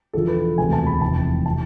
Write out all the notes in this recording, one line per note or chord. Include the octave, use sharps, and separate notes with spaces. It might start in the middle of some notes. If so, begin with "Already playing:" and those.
E1 E2 D3 F3 A4
B4
E1 D2 C3 G#5
A5
B5
F1 E2 C3 E3 A5
C3 E3 A5